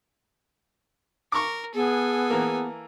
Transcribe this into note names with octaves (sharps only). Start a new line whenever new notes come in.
A#4 C#6 D6
B3 G#4 A4 G#5
E3 A#3